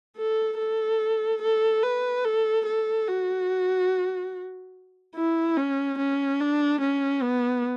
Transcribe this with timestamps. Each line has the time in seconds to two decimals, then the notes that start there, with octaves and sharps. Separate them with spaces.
0.17 A4
0.58 A4
1.42 A4
1.83 B4
2.25 A4
2.66 A4
3.08 F#4
5.15 E4
5.57 C#4
5.98 C#4
6.40 D4
6.81 C#4
7.23 B3